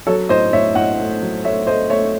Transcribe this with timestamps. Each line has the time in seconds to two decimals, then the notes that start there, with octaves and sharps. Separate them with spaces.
0.07 F#3 A4 C#5
0.29 A2 C5 D#5
0.53 A2 C#5 E5
0.75 A2 D#5 F#5
0.99 A3
1.22 F#3
1.44 A3 C#5 E5
1.67 A3 C5 D#5
1.90 A3 C#5 E5